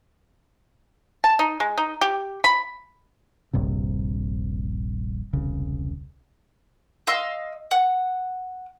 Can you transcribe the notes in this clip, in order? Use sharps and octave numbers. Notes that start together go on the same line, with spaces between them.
A5
D#4
G#3
D#4
G4
B5
D#1 A#1 G2 C3
E1 C2 C#3
D#5 F5 C6 E6
F#5